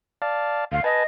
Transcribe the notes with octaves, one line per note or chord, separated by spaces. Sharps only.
D5 F5 A5
D2 F5
B4 D#5 G#5 A5